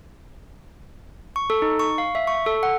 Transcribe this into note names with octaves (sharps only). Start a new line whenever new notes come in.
C#6
A4
D#4
C#6
F5
E5
C#6
A4
F#5